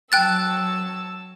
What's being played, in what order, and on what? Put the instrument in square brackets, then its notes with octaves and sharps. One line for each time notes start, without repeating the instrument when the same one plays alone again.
[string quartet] F#3 A5 E6 [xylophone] G5 F#6 A6